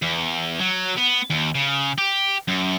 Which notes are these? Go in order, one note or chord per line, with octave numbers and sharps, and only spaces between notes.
E2
F#3
B3
D#2
C#3
G4
F#2